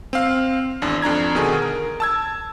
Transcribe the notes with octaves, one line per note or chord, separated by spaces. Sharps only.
C4 F5 F6
G#1 E2 D4
F2 D4 A#5 G#6
B2 D3 D#3 G#4
A#4
A5 E6 G#6